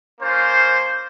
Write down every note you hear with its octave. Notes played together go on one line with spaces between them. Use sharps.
A#3 C#4 F4 C5